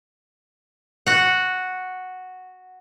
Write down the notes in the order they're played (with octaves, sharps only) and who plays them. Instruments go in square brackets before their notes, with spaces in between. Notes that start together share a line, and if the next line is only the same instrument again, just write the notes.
[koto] F#4 F#5